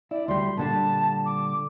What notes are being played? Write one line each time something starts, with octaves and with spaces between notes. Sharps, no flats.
E4 D5
D2 G3 C6
A#2 D3 G3 A5
D6